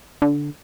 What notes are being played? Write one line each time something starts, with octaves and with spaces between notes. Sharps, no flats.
D3